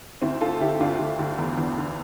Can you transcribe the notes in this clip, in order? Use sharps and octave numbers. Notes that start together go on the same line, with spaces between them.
D2 C4 E4
D3 F4 A4
D3 E4 G4
D2 D4 F4
D2
D2
E2
E2
D3